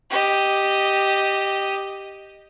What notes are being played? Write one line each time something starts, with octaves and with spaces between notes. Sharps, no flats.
G4 D#5